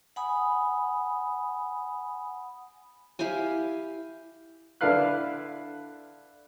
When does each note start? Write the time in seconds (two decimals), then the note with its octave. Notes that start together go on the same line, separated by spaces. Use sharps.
0.16 F#5 G#5 B5 D#6
3.19 E4 G4 F5 G#5
4.81 D3 D4 E4 B4 F5 F#6